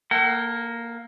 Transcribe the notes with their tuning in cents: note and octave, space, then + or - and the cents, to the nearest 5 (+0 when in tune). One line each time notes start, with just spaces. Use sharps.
A#3 +0 A4 +30 F#5 +45